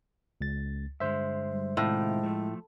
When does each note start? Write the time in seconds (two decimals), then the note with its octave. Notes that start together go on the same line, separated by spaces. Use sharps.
0.41 C#2 A6
1.00 G2 D3 G#3 C5 E5
1.49 G3
1.77 A2 C3 D#3 G#3 F4
2.23 F3 A3